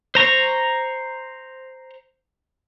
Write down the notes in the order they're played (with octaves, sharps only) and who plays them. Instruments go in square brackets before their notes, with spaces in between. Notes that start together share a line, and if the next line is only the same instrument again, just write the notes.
[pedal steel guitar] C5 A#5 C#6